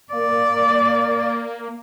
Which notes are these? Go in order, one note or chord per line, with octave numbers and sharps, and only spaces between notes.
A#3 D5